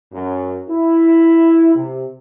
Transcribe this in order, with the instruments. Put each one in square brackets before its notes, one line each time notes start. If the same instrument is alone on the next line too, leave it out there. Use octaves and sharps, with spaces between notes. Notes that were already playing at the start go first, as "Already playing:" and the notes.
[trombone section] F#2
E4
C3